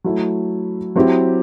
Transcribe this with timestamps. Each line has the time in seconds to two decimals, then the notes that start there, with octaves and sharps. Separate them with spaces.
0.04 F#3 A3 E4
0.96 F#3 C4 E4 G4